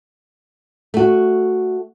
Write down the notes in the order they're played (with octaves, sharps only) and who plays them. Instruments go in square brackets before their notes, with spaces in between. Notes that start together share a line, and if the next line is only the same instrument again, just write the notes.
[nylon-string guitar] A3 F#4